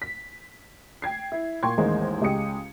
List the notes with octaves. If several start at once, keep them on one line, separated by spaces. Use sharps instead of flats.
B6
G5 G#6 C7
E4
A#2 G5 C6 C#6 G#6
A1 D#2 G#3 A#3 C5
C#2 G#3 G4 D#6 C#7